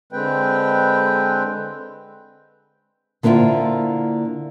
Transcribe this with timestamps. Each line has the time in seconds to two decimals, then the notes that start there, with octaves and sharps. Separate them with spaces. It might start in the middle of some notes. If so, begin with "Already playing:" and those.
0.13 D3 G#3 C4 B4 G5
3.23 D3 A#3 B3 E4 F4 C5